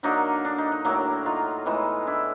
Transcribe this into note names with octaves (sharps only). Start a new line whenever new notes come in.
D3 F#3 A#3 D4 D#4
D4
D#4
D#4
A2 F#3 A#3 D4
D#4 F4
A2 E3 G#3 B3 D#4 F4
D4 E4